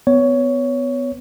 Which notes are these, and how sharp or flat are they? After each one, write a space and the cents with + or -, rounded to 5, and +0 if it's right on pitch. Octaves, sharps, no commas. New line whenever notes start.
B3 +25 C#5 +15